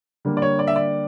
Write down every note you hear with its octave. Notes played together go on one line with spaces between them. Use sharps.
D3 G3 A#3
D5
C#5
D5
E5
D5